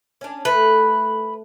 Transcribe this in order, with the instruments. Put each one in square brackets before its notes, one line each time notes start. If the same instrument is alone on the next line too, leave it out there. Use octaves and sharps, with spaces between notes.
[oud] C#4 D4
[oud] A3 [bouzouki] B4